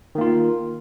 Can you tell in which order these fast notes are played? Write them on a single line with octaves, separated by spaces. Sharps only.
D#3 A#3 F4